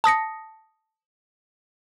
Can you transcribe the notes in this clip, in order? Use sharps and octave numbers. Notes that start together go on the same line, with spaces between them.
A5 D#6 A#6 C#7